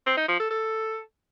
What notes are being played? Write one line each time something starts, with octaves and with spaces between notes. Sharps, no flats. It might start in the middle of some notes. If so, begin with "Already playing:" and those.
C4
D#4
F3
A4
A4